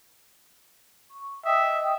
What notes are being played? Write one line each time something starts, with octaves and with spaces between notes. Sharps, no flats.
C#6
D#5 E5 G5 D#6